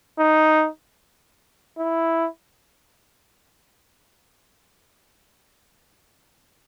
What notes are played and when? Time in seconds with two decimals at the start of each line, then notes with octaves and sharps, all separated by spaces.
0.19 D#4
1.78 E4